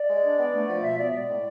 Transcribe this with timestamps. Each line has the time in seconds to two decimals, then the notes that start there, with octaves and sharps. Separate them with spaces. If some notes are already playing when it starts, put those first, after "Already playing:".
Already playing: D5
0.08 G#3
0.23 D4
0.38 B3
0.53 A3
0.68 F3
0.83 B2 E5
0.98 B3 D5
1.12 G#3 D5
1.29 A2